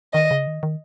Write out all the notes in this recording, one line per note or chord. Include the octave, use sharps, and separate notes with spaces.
D#3 D#5
C#3
D#3
D#3